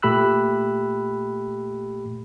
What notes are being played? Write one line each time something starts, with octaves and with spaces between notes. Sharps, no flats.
A#2 A3 G4 B5 E6 F#6